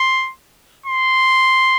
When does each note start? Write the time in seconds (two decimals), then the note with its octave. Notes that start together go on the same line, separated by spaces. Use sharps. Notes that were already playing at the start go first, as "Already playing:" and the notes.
Already playing: C6
0.86 C6